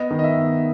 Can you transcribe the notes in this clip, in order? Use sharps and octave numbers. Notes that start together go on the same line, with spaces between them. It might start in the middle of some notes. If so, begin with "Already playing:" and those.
Already playing: B3 D#5
D#3
D#5
E5
B3